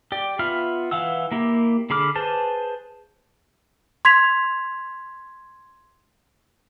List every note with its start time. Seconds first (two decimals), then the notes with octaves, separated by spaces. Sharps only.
0.12 G4 D5
0.39 B3 F4 E5 B5 F6
0.91 E3 F5 F#5 E6
1.32 A#3 E4 G4
1.90 D3 G#4 B5 D6 F6
2.16 G#4 B4 C5 A5
4.05 C6 G#6 B6 F7